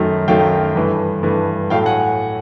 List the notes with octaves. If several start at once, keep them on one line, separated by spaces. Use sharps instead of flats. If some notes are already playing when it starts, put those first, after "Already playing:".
Already playing: F#2 D#3 F#3 A3
F#2 D#3 F#3 A3 F5 G5
G2 E3 A3
G2 E3 A3
A2 F#3 A3 F5 G5
F#5 G#5